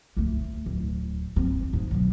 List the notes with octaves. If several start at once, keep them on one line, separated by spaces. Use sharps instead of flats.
D2 A3
D1
F#1 C4
G#2 C3
B2 F#3